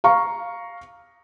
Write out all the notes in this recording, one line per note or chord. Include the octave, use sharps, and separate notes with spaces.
F5 A#5 C#6